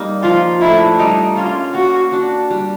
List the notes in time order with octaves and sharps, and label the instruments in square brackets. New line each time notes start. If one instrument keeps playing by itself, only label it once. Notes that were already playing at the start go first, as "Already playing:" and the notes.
Already playing: [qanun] G3 A#3 D#4
[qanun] F3 [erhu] F4
[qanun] A3 D4 [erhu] E4
[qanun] G3 [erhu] D#4
[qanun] A#3 C#4 [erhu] F4
[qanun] A#3 [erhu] F#4
[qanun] D4 F#4
G3